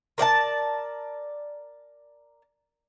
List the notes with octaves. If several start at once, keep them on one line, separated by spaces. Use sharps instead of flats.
A#4 D5 F#5 A5